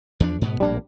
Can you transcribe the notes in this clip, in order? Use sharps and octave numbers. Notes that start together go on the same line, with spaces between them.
E2 F3 D4
G#2 B2 B3
A#1 A2 G3 A#3 D4